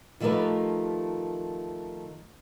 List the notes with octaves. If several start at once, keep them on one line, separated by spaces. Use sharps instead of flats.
D#3 F3 A3 G4 A#4 B4